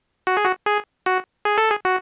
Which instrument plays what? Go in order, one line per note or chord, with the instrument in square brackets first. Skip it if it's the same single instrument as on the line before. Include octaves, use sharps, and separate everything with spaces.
[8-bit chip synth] F#4
G#4
F#4
G#4
F#4
G#4
A4
G#4
F#4